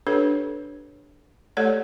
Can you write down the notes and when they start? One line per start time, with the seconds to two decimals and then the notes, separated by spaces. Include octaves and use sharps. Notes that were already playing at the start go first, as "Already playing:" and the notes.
0.07 D4 G4 A4 B4 C#5
1.57 A3 G4 A4 C#5 D5 F#5